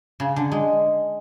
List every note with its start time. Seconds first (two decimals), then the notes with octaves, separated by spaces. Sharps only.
0.20 C#3
0.36 D3
0.52 G#3